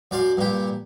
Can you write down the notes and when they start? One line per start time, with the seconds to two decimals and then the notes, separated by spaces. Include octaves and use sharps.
0.11 F#2 D5 F5 C6
0.37 G2 A#2 G4